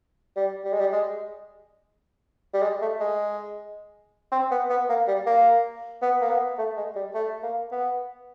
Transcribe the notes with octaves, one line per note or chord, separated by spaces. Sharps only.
G3
G3
G#3
G3
G#3
G3
G#3
A3
G#3
C4
B3
B3
A#3
G3
A#3
B3
A#3
B3
A3
G#3
G3
A3
A#3
B3